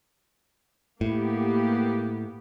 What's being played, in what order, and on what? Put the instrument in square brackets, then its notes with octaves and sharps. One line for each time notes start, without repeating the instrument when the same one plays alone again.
[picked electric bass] A2 [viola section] A#3 B3 G4